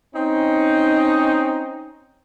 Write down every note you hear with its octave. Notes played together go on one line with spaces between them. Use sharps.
C4 C#4 D#4